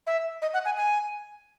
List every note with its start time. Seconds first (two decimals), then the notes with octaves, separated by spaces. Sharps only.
0.07 E5
0.42 D#5
0.54 F#5
0.65 G#5
0.77 G#5